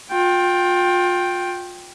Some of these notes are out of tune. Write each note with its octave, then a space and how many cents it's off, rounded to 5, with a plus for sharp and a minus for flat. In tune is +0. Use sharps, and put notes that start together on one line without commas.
F4 +30 G5 +0